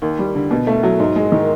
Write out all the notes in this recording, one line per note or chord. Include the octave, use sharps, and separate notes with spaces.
D#2
G3
D3
B2
A3
F#3
G#2
G#3
D#3